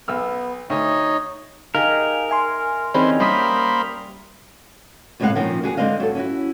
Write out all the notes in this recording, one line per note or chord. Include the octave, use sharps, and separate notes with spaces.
B1 B3 E6 F6
D2 D#4 C#5 D#5
D#4 G4 G#4 A#4 F5 G#5
E5 G#5 C6
E3 G3 C4 C#4 D#4 G#4 C5 B5
G3 A#3 G4 C5 E5 B5 D#6 B6
F#2 A2 C3 G#3 F5 F#5
A#2 D#3 F3 C4 C#4
E2 F#3 G#4 F#5
D3 G#3 C4 F4 D#5 F5
F#3 A4
C#4 E4 F#4